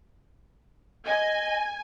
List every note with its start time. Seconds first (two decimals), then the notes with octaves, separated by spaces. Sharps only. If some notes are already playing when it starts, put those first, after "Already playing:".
1.06 D#5 G#5